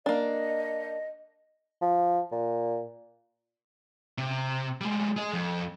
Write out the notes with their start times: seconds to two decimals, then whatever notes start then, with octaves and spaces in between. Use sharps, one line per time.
0.06 A#3 D4 D#5
1.82 F3
2.32 A#2
4.18 C3
4.81 G3 G#3
5.17 G#4 D#5
5.33 F2